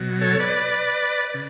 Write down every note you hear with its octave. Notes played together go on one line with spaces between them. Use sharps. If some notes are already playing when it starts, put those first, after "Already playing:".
Already playing: B2 F#3
A4 C#5
B4 D5
D5
C#3